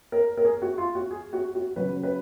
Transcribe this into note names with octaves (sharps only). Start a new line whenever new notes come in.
A#4
A#4
G#4
F#4
F4
F#4
G#4
F#4
F#4
C#3 F#3 B4
B4